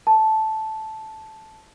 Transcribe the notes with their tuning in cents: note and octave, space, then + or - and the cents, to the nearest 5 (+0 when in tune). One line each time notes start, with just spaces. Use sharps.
A5 -5